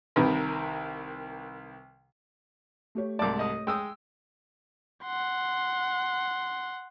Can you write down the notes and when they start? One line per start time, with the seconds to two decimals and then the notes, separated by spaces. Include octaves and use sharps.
0.16 C2 C3 D#3 A#4 B4
2.95 A3 G4 C#5
3.19 C2 G#2 D5 A5 D6
3.39 D#5 D#6
3.67 G#3 G5 D#6 E6
5.04 F#5 C6